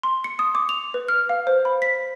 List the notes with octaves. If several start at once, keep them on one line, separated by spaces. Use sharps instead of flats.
C6
C#7
D#6
D6
F7
B4
F6
F5
C5
B5
B6